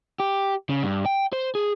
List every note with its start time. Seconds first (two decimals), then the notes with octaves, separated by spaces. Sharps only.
0.20 G4
0.70 C#3
0.83 G2
1.06 G5
1.33 C5
1.55 G#4